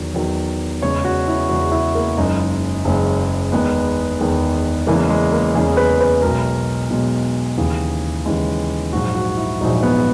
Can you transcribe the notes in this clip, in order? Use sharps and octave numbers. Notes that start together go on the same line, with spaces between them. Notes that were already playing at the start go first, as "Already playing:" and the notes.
Already playing: E2 D#3 F#3
E2 D#3 F#3
E2 C#3 G#3 C#5
F#4
E4
E2 C#3 G#3 F#4
E4
A#3
F#1 F#2 C#3 G#3 D#4
F#1 F#2 C#3 G#3
E2 D#3 G#3 B3
E2 D#3 G#3
E2 C#3 E3 G#3 A#3
G#3
A#3
E2 C#3 E3 G#3 G#4
B4
B4
B1 B2 G#3 A#4
B1 B2 G#3
D#2 C#3 E3 G#3 G#4
D#2 C#3 E3 G#3
A#1 G#2 F#3 F#4
F#4
E4
A#1 G#2 F#3 D#4
B3